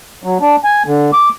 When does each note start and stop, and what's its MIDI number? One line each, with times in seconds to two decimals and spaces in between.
0.24 0.38 54
0.41 0.56 62
0.64 0.83 80
0.86 1.11 50
1.13 1.29 86